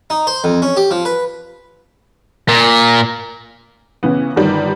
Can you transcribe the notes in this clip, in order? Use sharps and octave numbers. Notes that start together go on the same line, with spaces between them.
D#4
C5
F2
C#4
G4
F3
B4
A#2
C#3 E3 B3
G1 D#3 G3